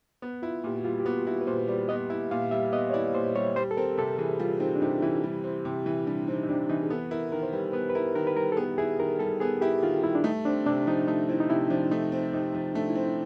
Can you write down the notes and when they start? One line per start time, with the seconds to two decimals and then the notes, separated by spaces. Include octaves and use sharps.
0.22 B3
0.42 E4 F4
0.64 A#2 G4
0.76 F#4
0.84 G3 F4
1.00 G4
1.05 B3 F#4
1.27 E4 F#4
1.41 B4
1.47 A#2 C5
1.68 G3 D5
1.89 B3 D#5
2.10 E4 E5
2.31 A#2 F5
2.51 G3 E5
2.72 B3 D#5
2.90 C#5
2.93 E4 D5
3.14 A#2 C5
3.35 G3 C#5
3.56 G3 C5
3.71 A4
3.77 C4 A#4
3.98 C3 A4
4.18 E3 G#4
4.40 G3 F4
4.60 C4 D#4
4.76 D4
4.81 C3 D#4
5.02 E3 E4
5.24 G3
5.44 C4
5.65 C3
5.86 E3
6.07 G3 D4
6.28 C4 D#4
6.43 D#4
6.49 C3 D4
6.69 E3 D#4
6.83 G#4
6.90 B3 A4
7.11 E4 A#4
7.32 D#3 A#4
7.43 C5
7.53 G3 B4
7.73 B3 B4
7.90 B4
7.95 E4 A#4
8.15 D#3 A#4
8.27 B4
8.37 G3 A#4
8.52 A4
8.57 B3 G#4
8.78 E4 G#4
9.00 D#3 A#4
9.19 G3 A4
9.40 B3 G#4
9.61 E4 G4
9.82 D#3 F4
10.04 G3 E4
10.15 D4
10.24 A3 D#4
10.45 C4 D4
10.66 C3 D4
10.87 F3 D#4
11.08 A3 D#4
11.29 C4 E4
11.40 D#4
11.50 C3 E4
11.70 F3 D4
11.91 A3 D#4
12.12 C4
12.33 C3 D#4
12.55 F3
12.75 A3 D4
12.90 E4
12.95 C4 D#4